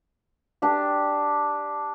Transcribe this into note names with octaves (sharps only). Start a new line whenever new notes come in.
D4 G4